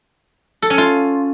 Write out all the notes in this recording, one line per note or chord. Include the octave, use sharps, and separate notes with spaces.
A4
C#4
F4